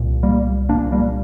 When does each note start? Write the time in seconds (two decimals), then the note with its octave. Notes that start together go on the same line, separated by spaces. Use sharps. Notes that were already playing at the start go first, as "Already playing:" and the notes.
Already playing: C2 A#2
0.23 G3 A#3
0.69 C2 A#2 A#3 D4
0.92 G3 A#3